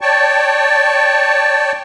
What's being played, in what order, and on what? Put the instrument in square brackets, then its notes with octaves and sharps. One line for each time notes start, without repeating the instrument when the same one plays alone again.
[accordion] C#5 D5 G5 A5 C#6